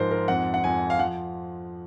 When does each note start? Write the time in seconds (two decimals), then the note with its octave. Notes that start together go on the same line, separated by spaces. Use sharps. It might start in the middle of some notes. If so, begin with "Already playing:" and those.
Already playing: G#2 F3 A#4 C5
0.11 A#4
0.28 F2 F#5
0.54 F#5
0.64 F2 G#5
0.90 F5
0.98 F3 F#5